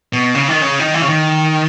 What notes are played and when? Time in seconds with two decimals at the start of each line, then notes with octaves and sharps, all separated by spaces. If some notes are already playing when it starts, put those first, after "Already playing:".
0.13 B2
0.35 C#3
0.48 D#3
0.62 C#3
0.80 D#3
0.94 E3
1.02 C#3
1.09 D#3